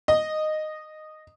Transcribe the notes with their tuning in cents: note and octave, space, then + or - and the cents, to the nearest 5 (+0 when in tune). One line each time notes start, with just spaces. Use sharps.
D#5 -10